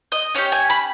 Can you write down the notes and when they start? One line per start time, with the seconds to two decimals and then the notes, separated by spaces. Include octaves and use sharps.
0.12 D#5
0.34 C#4 E4 G4 C#5
0.52 G#5
0.70 B5